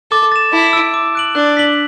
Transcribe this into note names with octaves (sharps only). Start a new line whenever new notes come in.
A4 D6
A6 E7
E4 A5
E6 D7
D6
F#6 D7 F#7
D4 F#6
B6 F#7